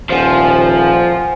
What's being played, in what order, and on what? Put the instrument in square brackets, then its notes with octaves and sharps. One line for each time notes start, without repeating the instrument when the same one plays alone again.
[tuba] D#1 [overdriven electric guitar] F3 [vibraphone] C5 F#5 G#5